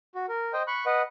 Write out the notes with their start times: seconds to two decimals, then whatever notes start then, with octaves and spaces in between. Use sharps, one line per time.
0.15 F#4
0.29 A#4
0.53 C5 D#5 G5
0.67 B5 C#6 F#6
0.86 B4 D#5 F#5